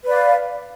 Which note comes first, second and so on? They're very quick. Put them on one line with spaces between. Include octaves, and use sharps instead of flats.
B4 D5 F5